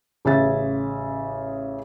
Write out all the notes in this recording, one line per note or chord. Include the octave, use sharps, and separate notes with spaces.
A1 C#3 G#4 E5 A6